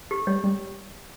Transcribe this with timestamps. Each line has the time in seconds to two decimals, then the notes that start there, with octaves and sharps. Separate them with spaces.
0.11 G4
0.27 G3 C#5
0.44 G3